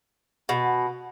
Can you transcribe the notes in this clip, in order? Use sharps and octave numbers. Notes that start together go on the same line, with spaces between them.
B2